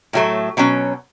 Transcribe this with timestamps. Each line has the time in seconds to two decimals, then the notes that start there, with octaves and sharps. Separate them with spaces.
0.13 A2 F#3 A3
0.57 B2 F#3 C#4